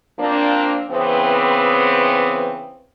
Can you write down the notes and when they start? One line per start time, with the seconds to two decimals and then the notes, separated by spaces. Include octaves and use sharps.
0.19 F3 A#3 C4 D4
0.90 C#3 E3 B3 C4